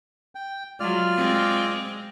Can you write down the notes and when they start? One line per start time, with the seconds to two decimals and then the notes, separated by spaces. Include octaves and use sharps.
0.35 G5
0.80 F#3 G#3 F4 D5 F6
1.17 G#3 C4